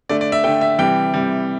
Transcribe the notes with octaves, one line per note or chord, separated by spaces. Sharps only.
D3 A3 D5
D5
E5
D3 A3 G5
E5
C3 E3 G3 G5
C3 E3 G3